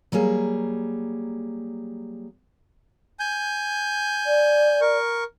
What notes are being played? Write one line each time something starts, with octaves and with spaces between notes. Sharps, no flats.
F#3 G3 A#3 G#4
G#5 G6
D5
A#4 C#6